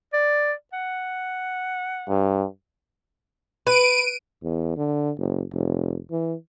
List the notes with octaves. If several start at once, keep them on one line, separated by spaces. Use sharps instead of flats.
D5
F#5
G2
B4 D7 D#7
E2
D3
F#1
F1
E3